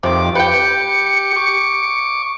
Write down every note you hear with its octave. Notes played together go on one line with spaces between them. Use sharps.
F2 C3 D#3 D6
G4 B4 G5 D6 C#7
C#6 D6